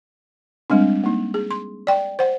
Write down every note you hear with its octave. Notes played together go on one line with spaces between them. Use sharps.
G3 G#3 C4 D4
A#3 D#4
G#4
C6
D5 G5
C5 F#5